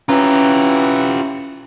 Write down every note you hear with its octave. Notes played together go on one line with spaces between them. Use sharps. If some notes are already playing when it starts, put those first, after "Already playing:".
E3 C#4 F4 G4 A#5